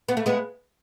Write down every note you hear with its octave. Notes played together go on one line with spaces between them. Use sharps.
B3
A3
G#3 B3